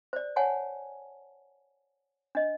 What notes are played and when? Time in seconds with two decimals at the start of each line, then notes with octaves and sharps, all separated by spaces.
0.13 C5 D5
0.36 C#5 F#5 G#5 A5
2.35 D4 D#5